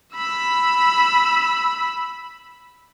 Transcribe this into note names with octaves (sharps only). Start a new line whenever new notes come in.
B5 E6